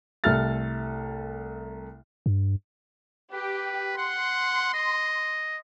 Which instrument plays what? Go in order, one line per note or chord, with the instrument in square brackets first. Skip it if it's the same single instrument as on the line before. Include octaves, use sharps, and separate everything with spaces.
[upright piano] C2 A3 A4 E5 F6 A6
[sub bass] G2
[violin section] G4 [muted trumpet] B4
[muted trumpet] F#5 [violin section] C6
[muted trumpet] D#5